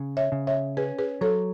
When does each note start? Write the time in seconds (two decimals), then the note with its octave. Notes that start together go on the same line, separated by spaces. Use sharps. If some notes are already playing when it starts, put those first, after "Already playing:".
Already playing: C#3
0.17 C#5 E5
0.32 C#3
0.47 C#5 E5
0.77 C#4 G#4 B4
0.99 G#4 B4
1.21 F#3 A4 C#5